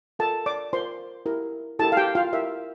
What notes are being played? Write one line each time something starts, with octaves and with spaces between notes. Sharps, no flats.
F4 A4 A#4 A5
D5 D6
F4 A#4 C5 C6
E4 G4 A#4
E4 G4 A4 A#4 A5
F5
G4 G5
F4 F5
E4 G4 A#4 E5